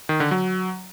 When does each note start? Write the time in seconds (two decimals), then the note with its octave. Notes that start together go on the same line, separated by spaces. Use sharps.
0.09 D#3
0.20 D3
0.31 F#3